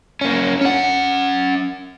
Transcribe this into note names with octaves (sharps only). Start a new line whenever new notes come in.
A#3 C#4
C#4 F#5